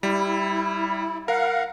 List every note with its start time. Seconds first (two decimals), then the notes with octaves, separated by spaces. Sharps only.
0.03 G3 E4
1.28 A#4 F5 F#5